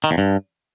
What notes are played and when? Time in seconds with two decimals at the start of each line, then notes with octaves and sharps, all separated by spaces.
0.04 D#3
0.11 E2
0.18 G2